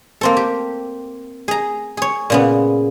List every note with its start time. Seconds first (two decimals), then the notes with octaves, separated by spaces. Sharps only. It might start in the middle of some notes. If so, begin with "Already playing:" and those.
0.21 A#3 C4 A4
0.37 G4
1.48 G#4 A#5
1.97 G#4 C#5
2.30 A#2 C#3 B3